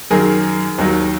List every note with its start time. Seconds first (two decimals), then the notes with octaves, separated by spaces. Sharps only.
0.11 F#2 D#3 F#3 G#4 A#4
0.78 D#2 D#3 F#3